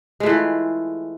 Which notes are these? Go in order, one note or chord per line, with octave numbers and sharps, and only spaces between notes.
E3 G#3 A3 F4